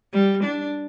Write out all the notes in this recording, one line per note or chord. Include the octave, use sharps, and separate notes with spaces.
G3
D4